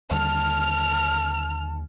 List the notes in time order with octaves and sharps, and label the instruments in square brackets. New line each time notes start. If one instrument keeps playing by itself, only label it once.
[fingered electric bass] D#2 D3 G3 [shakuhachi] A5 [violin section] F6